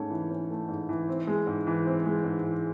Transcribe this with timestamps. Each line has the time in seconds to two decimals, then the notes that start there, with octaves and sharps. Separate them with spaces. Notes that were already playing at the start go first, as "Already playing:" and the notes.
Already playing: G#2 A3 C#4
0.10 E3
0.30 C#4
0.50 A3
0.68 G#2
0.89 E3
1.08 C4
1.27 G#3
1.47 G#2
1.67 E3
1.86 C4
2.06 G#3
2.24 G#2
2.43 E3